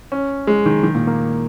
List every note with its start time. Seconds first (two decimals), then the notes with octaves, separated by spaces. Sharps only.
0.12 C#4
0.47 G#3
0.66 D#3
0.83 D#3
0.95 A#2
1.07 A#3